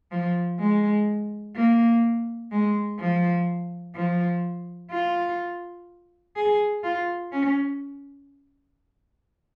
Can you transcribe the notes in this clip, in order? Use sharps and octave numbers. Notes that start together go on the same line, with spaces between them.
F3
G#3
A#3
G#3
F3
F3
F4
G#4
F4
C#4